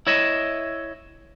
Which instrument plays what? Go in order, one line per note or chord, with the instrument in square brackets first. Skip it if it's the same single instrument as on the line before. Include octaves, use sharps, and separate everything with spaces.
[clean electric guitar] E4 C#5 D#5 E5